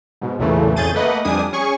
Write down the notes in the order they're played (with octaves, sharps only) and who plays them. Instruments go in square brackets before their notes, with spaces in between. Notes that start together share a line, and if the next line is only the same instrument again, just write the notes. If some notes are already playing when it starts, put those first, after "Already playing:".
[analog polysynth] G#2 B2
B1 E2 A#2 C#3 E3 A3
F2 C#4 G#4 G6 A6 D#7
A3 A#3 B4 D#5 F#5
F2 G3 D4 G#5 D#6
C#4 G#4 G#5 C#6